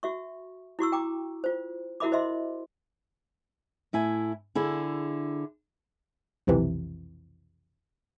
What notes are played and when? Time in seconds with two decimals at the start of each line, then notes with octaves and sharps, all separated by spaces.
0.03 F#4 E5 C#6
0.79 E4 F#4 C#6 E6
0.92 G5 A#5 D6
1.44 F4 C5
2.00 E4 F#4 A#4 E5 B5 D6
2.12 C5 D#5 E5 C6
3.93 A2 E4 G#5
4.55 D3 E4 G#4
6.47 B1 F2 C3 E3